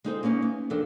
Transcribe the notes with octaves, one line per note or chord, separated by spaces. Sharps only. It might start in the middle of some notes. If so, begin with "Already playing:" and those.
G#3 C4 D#4 F4 A4 C5
A#3 B3 C#4 D#4 E4
B3
F2 C3 F3 D4 A4 A#4